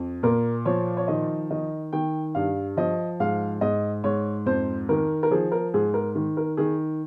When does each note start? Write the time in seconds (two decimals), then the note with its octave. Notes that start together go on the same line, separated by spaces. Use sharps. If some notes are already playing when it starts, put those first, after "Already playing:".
Already playing: F2
0.23 A#2 A#4
0.65 F3 C#5
0.97 C#5
1.08 D#3 D#5
1.51 D#3 D#5
1.93 D#3 G5
2.35 G2 F5
2.77 F3 D#5
3.20 G#2 F5
3.61 G#2 D#5
4.04 G#2 C#5
4.46 F2 C5
4.89 D#3 A#4
5.23 A#4
5.31 F3 G#4
5.52 A#4
5.74 G#2 G#4
5.94 A#4
6.15 D#3
6.37 A#4
6.57 D#3 G#4